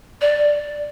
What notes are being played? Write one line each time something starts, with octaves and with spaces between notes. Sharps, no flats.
D5